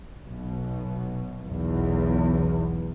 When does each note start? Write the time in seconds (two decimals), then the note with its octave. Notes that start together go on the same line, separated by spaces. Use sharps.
0.24 B1 B2
1.43 B1 E2